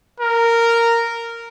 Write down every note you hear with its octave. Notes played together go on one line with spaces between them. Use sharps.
A#4